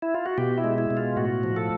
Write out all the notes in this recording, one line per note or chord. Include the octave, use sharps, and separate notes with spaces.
E4
F4
F#4
B2 G4
E4
G#3
E4
B2
F4
A2 F#4
F3
A4